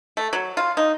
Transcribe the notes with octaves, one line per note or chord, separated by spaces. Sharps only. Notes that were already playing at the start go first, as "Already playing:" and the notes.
A3
F#3
F4
D#4